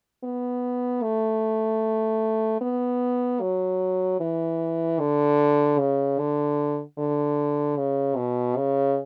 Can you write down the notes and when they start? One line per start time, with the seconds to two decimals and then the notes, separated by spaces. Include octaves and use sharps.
0.24 B3
1.03 A3
2.61 B3
3.41 F#3
4.20 E3
5.00 D3
5.79 C#3
6.19 D3
6.98 D3
7.77 C#3
8.17 B2
8.57 C#3